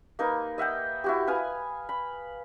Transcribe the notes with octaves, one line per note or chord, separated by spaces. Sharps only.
A#3 D#4 B4
D#5 E5 F#5 G5
E4 F#4 G4
B4 F5 G#5 D#6
B5